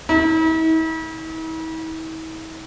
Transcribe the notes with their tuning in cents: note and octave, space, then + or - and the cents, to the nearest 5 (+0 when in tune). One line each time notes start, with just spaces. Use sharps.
E4 -45